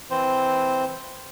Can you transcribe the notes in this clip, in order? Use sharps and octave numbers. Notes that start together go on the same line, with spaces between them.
E3 C4 C5